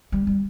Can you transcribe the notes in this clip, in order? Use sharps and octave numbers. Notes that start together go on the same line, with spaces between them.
G3
G3